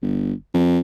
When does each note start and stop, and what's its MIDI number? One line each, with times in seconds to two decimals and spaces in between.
0.02 0.33 31
0.54 0.79 41